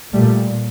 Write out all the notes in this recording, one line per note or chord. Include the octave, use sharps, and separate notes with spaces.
A#2 G3 A3